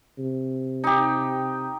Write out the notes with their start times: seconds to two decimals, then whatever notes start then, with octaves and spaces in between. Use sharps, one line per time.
0.18 C3
0.84 D#4 G4